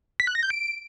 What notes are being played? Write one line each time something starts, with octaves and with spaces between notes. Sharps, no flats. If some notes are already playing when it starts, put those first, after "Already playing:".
B6
F#6
A#6
G6
D7